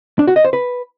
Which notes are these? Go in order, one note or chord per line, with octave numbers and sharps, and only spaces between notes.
D4
F#4
D#5
C5
B4